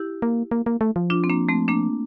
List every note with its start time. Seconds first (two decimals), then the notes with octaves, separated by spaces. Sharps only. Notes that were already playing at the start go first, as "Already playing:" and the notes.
Already playing: E4 G4
0.22 A#3
0.51 A#3
0.66 A#3
0.81 A3
0.96 F3
1.10 D4 F4
1.24 C4
1.29 A#3 D4
1.49 A3 C4
1.68 A#3 D4